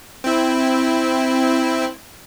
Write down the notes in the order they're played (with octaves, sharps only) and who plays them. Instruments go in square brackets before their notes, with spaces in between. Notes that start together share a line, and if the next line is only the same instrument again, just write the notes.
[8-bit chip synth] C4 E4